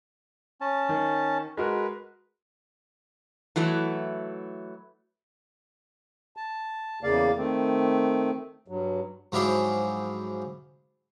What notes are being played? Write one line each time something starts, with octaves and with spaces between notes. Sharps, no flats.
C#4 A5
D#3
G#3 F#4 A#4 B4
E3 F#3 A3 E4
A5
E2 C#3 A#3 D5 F5
D#3 A3 C4
G2 F#3
G#2 F3 F#3 E4 G4 G#4